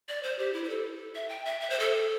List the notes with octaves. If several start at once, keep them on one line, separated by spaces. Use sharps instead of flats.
D5
C5
G4
E4
C5
A4
E5
G5
E5
E5
C5
A4